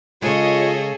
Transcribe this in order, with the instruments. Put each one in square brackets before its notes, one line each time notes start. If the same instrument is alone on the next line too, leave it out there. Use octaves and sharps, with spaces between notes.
[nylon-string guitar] C#3 G#3 [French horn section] F4 [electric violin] G#4 A4 [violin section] C#5 D#5